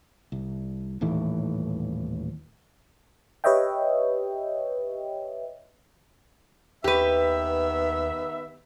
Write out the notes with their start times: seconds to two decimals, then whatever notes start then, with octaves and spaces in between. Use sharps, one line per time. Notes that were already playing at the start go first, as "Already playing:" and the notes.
0.32 C2
1.01 D#1 D#2 A2 E3
3.44 G4 B4 C#5 D#5 E5 G5
6.84 D#2 D#3 B3 G4 B4 E5